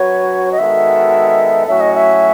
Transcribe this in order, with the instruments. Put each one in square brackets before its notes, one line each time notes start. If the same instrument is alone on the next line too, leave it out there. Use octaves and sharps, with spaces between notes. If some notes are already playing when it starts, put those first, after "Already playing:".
Already playing: [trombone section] F#3 C#4 F#4 B4 [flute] C#5
[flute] D#5
[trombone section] D#3 G#3 B3 F#4 A4 [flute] E5
[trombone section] A2 F#3 A3 C#4 F#4 [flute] E5
[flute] D#5
E5